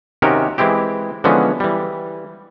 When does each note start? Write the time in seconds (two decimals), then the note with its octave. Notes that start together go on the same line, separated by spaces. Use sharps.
0.22 C3 D#3 C#4 F#4 G4 A#4
0.58 E3 G#3 C4 E4 G4
1.24 D3 E3 F3 G#3 B3 C#4
1.60 E3 G3